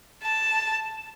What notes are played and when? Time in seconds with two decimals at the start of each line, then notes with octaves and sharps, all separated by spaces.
0.23 A5